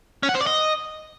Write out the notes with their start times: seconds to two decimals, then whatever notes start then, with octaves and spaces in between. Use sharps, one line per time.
0.23 C#4
0.29 F#5
0.35 C5
0.41 D5
0.47 D#5